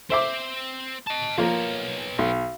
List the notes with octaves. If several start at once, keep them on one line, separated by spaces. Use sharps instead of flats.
C4 C5 E5 D6
D#5 A5
F3 A#3 B3 A#4 C#5
B1